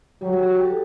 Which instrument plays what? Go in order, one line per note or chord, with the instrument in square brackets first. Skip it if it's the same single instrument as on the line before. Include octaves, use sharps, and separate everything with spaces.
[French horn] F#3 [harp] G3
[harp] G3
F#4
G4
A4